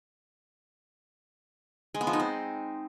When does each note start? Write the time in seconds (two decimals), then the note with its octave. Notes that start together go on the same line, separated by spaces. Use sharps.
1.95 G#3
2.01 B3
2.07 F3
2.13 D#4
2.20 C4